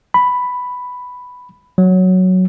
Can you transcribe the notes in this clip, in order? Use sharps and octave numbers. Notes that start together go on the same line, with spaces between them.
B5
F#3